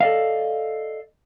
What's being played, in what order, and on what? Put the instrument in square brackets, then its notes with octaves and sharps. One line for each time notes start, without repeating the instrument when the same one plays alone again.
[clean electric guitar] A4 D5 D#5 F5